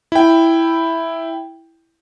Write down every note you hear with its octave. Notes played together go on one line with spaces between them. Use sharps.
E4 G5